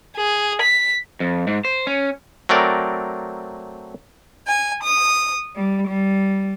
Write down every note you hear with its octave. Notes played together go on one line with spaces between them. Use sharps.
G#4
B6
F2
G#2
C5
C#4
F#3 A3 C4 A#4 D5
G#5
D#6
G3
G3